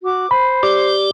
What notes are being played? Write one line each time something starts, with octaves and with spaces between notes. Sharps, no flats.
F#4 D6
C5 B5
G4 D5 D6